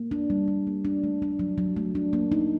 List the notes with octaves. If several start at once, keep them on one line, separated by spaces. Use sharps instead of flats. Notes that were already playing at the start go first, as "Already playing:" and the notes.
Already playing: A#3
D4
G3
G3
A#3
D4
A3
D4
F#3
F#3
A3
D4
A#3
D#4